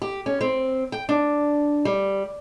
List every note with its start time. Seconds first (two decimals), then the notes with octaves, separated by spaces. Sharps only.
0.02 G4
0.26 C#4
0.41 C4
0.92 G5
1.09 D4
1.85 G3